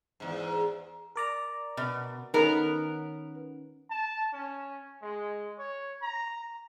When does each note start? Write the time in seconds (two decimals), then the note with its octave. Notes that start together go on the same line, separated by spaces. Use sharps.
0.20 E2 G#2
1.16 A#4 D5 A#5
1.77 B2
2.34 D#3 B3 C#4 A#4
3.90 A5
4.33 C#4
5.02 G#3
5.59 C#5
6.02 A#5